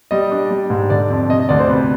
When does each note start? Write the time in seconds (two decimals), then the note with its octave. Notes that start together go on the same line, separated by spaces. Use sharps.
0.11 G3 D#5
0.32 D4
0.51 G3
0.70 G#2
0.90 D3 D5
1.10 F2
1.29 C3 D#5
1.40 D#5
1.49 D2 D5
1.59 C5
1.69 C3 B4